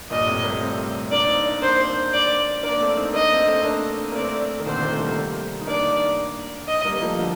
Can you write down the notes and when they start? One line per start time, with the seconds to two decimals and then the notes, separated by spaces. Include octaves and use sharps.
0.10 G2 A#2 D#5
0.27 A2 C3
0.44 G3 A#3
0.61 A3 C4
1.12 A#3 D4 D5
1.28 C4 D#4
1.45 D4
1.53 D#4
1.61 A#3 D4 C5
2.13 D5
2.63 A#3 D4 D5
2.80 A3 C4
2.97 C4 D#4
3.14 A#3 D4 D#5
3.31 A3 C4
3.48 A3 C4
3.64 A#3 D4
4.12 A#3
4.15 A3 C4 D5
4.60 D#3
4.66 A#2 D3 C5
4.75 C3
4.83 A#2 D3
4.92 A3
4.99 G3 A#3
5.61 D#4
5.67 A#3 D4 D5
6.68 D#5
6.85 G3 A#3
6.96 A#3
7.02 F3 A3
7.19 D3 F3